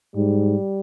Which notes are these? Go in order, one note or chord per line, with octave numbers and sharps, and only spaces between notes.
G#2 G3